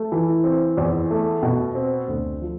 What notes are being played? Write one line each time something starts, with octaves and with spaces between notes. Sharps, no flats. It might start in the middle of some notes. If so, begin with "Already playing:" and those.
Already playing: A3
E3
C4
E2
A3
B2
C4
D2
F3